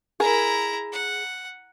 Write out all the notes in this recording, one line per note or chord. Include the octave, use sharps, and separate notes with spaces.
E4 G#4 A#4 A#5
F#5